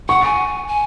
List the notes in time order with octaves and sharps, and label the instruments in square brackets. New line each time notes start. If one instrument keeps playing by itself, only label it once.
[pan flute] F#5 [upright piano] C#6
[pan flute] G#5
G#5